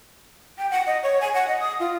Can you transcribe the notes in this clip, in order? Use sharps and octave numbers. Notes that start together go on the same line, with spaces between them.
G5
F#5
D#5
C#5
G#5
F#5
D#5
D#6
F4